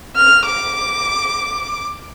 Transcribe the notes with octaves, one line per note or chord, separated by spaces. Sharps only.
F6
D6